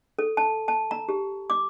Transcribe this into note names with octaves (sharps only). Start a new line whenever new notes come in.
A4
A5
A5
A#5
G4
D6